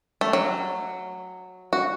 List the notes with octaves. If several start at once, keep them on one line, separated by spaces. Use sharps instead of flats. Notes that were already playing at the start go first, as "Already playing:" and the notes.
A3
F#3
F#4